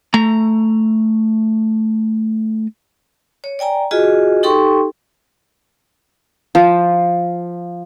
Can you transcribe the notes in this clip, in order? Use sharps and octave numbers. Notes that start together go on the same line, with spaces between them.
A3 A#5
C#5
D5 G5 G#5 A#5
F4 F#4 G#4 D#5 G#5
D#4 G4 A4 G5 C6 C#6
F3